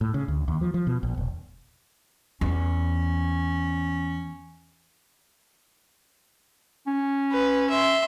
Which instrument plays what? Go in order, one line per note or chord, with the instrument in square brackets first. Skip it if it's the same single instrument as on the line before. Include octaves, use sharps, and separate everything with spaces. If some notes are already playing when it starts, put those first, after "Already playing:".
[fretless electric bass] A2
C#3
D2
D#2
F3
F3
B2
A#1
E1
[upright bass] E2 [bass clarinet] C#4
[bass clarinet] C#4
[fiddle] B4
E5 C6